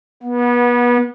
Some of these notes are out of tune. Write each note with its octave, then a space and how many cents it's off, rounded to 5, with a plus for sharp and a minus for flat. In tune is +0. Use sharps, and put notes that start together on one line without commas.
B3 -30